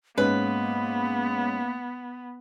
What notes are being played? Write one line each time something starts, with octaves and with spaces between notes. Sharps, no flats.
G#2 A#3 B3 C#4 B4